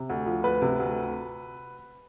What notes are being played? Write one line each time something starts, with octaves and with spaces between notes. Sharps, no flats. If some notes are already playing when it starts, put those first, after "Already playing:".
Already playing: C3
D2
F3
D2 B4
C3
D2